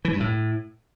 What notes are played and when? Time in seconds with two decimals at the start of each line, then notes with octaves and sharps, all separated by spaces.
0.05 E3
0.12 G2
0.20 A2